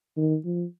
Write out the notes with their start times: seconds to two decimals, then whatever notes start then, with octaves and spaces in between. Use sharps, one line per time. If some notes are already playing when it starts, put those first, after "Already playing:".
0.17 D#3
0.45 F3